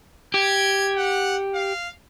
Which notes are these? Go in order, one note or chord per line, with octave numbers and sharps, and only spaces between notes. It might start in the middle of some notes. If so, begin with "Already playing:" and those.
G4 G#6
F#5
F5